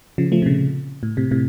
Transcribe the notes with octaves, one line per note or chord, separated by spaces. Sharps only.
C#3 F3
F3 A3
C3
A#2 C#3
A2
A2 C3
A2 C3